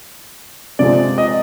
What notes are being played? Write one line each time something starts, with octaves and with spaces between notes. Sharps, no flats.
C3 F3 G#3 D5
D#5